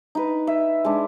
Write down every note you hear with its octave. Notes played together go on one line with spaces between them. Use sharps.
D#4 B4
E5
G#3 D4